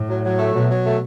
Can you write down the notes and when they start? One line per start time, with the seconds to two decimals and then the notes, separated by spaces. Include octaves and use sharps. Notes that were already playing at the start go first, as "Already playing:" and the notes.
Already playing: A2
0.09 F#3
0.24 F#3
0.39 A3
0.54 B2 F#3
0.69 F#3
0.85 A3